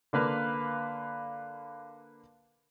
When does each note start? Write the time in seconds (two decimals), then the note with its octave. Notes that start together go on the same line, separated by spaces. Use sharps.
0.13 D3 A#3 B4 F5